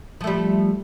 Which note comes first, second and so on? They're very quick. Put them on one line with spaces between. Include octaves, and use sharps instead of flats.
F3 A3 G3